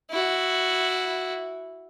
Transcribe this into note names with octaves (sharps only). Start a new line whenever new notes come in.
E4 F#4